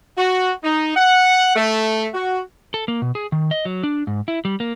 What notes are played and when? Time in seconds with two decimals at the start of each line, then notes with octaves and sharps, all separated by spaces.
0.18 F#4
0.64 D#4
0.96 F#5
1.56 A3
2.14 F#4
2.74 A4
2.88 A#3
3.02 B2
3.15 G#4
3.32 D#3
3.51 D#5
3.65 F#3
3.83 D4
4.07 G#2
4.28 E4
4.45 G3
4.60 A#3